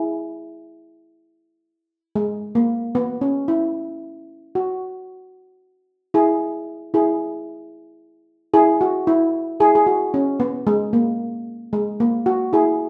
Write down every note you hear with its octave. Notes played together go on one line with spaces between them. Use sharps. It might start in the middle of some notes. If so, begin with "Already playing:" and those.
Already playing: E4 G#4
G#3
A#3
B3
C#4
E4
F#4
E4 G#4
E4 G#4
E4 G#4
F#4
E4
E4 G#4
G#4
F#4
C#4
B3
G#3
A#3
G#3
A#3
F#4
E4 G#4